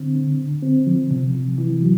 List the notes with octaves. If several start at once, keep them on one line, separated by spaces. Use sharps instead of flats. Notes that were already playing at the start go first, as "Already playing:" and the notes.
Already playing: D3 C4
D3
D3
C4
F3
C3
C3
E3
F#3